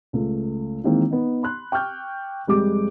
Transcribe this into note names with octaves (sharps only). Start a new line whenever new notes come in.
C#2 A3
D#3 E3 G#3 A#3 C4
B3 D#4
B5 C6 F#6
G5 C#6 D6 F6 G6
F1 G3 G#3 G4 D6